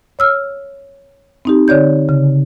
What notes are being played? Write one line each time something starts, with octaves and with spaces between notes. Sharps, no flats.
C#5 E6 F6
C4 D#4 G4
D3 C#5 D5 G6
C#3